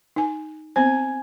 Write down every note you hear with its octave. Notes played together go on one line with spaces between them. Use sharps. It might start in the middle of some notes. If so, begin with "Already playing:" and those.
D#4 G#5
B3 C4 C5 G#5